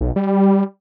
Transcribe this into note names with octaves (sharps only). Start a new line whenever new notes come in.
B1
G3